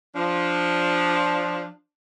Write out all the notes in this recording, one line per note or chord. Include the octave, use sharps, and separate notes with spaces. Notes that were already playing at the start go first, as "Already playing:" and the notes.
F3 D4